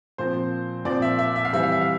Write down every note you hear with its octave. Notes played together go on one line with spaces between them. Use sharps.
A#2 F3 C4 C5
A#2 F3 C4 D5
E5
E5
E5
F5
E3 G3 C4 E5
F5
E5
F5